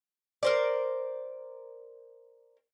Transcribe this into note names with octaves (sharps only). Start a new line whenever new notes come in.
A#4 C5 D5